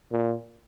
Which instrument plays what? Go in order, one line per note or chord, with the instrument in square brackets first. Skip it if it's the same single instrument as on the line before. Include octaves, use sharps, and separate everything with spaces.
[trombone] A#2